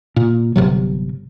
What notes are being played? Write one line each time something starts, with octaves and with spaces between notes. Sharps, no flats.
A#2
G1 D2 C3 F#3